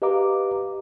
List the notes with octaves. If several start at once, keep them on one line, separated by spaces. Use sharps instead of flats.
G4 B4 D#5 F5 A#5 D6